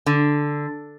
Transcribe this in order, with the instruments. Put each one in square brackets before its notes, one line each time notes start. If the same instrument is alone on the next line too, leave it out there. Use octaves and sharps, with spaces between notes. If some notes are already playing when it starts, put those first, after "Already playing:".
[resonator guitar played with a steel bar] D3